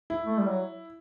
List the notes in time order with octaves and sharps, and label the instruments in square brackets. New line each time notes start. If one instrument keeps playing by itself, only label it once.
[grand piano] E4
[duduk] A3
G3
F#3